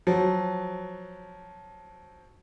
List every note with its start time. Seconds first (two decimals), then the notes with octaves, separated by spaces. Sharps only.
0.07 F3 F#3